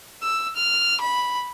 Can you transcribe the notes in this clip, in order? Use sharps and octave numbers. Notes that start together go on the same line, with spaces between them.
E6
F6
B5